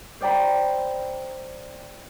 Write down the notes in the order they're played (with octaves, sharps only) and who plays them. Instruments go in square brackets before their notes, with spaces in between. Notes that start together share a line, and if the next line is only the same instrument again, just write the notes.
[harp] C5 D5 G5 A#5 B5